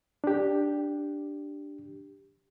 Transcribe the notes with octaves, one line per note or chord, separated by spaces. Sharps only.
D4 G4